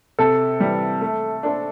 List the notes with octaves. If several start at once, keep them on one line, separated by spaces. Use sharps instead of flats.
C3 A4
E3 G3
A3
D4 A4 C5